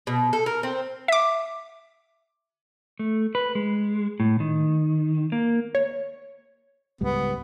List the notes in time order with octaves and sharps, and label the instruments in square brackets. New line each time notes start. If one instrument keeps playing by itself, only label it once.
[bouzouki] B2
A4
A#4
C4
[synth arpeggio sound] E5 D6
[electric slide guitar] A3
B4
G#3
A2
D#3
A#3
[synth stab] C#5
[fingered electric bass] C#2 G#2 G3 [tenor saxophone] B3